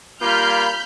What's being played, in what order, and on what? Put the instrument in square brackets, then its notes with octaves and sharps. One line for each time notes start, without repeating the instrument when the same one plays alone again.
[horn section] G3 A#3 F4 [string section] B5 F6 G6